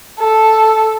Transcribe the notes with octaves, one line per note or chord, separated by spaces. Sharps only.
A4